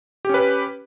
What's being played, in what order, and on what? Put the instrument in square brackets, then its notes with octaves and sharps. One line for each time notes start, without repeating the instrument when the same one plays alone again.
[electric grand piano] G4
C#4
B4